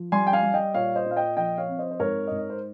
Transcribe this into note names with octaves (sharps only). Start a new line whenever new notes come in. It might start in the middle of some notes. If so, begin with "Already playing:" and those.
Already playing: F3
G3 G#5 C6
G5
F5 G#5
G3
D#5 G5
A#2 C#5 F5
C5 D#5
A#2
F5
D#5 G5
F3 D#5 G5
C#5 F5
C4
C5 D#5
C5
G#2 A#4 C#5
G#2 D#5
C#5
C5